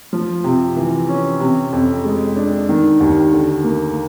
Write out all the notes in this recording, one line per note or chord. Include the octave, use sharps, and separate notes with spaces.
F3
C3
E3
C#4
C3
F2
G#3
D4
D#3
D#2
D3
A#3